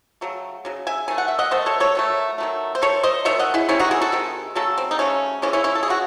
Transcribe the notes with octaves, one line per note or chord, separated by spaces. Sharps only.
C#3 F#3 A3
C#3 F#3
E5 G#5
D#3 A3 G#5
F#5
E5
D#5 F#5
D#3 A3 C5 D#5
A4 C#5
A4 C#5
D#3 F#3 A3
D#3 F#3 A3
C5
D#3 A3 A4 C#5
C5 D#5
D#3 A3 C#5 E5
D#5 F#5
E4 G#4
C3 D#3 G#3 C#4 E4
D#4 F#4
E4 G#4
F#4 A4
C3 D#3 G#3
C#3 F#3 A3 A4
C4
D#4
C#3 F#3 A3 C#4
C#3 E3 G#3 C#4
C#4 E4
C#4 E4
A4
G#4
C#3 E3 G#3 F#4